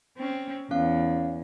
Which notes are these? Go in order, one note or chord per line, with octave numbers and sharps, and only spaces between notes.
C4 C#4
E2 C#4 F5